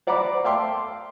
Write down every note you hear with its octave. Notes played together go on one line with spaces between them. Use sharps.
C5 D5 F#5 A#5 B5 D6
E5 F5 G5 A5 C6 D6